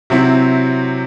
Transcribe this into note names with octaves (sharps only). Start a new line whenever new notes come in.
C3 F#3 C4 E4